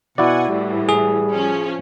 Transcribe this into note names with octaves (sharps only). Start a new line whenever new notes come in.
B2 E4 F#4 D5 F#5 G#5
A2 E3 G3
G#4
F3 C#4